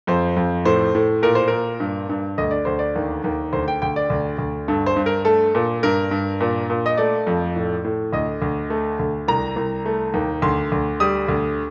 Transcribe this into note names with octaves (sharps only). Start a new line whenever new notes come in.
F2 C5
F2
A2 C5
A2
A#2 A#4
C5
A#2 A#4
G2
G2
D2 D#5
D5
D2 C5
D5
D#2
D#2
D2 C5
G5
D2 G5
D5
D2
D2
G2 A4
C5
G2
A#4
A3 A4
A#2
G2 A#4
G2
A#2
A#2
D#5
A3 D5
F2
A2
A2
D2 D#5
D2
A3
D2
C2 A#5
C2
A3
D#2
D2 C6
D2
G3 D#6
D2